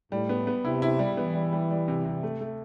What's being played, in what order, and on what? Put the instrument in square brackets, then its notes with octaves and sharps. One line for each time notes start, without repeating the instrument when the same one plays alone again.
[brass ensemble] A2 [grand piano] G3
[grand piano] B3
B3
[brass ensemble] C3 [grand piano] E4
[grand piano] E4
G3
[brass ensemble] E3 [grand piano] B3
[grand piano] G3
G3
G3
C3
C3
A3
A3